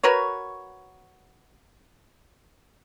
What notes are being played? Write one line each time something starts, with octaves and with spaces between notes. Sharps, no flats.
F#4 A#4 B4 C#5